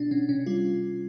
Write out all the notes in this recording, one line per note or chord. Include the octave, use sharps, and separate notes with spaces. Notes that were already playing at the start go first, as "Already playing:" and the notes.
Already playing: B2 D4
B2 C#4
C3 C#4
G3 F4